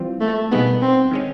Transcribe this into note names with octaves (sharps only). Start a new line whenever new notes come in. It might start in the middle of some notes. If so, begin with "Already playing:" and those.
Already playing: E3 G3 C4 F4
A3
B2 G3 A#3 B3 D#4 G#4
C4
D#3 G#3 C#4